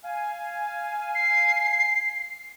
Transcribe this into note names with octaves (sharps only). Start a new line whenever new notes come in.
F5 G#5
C7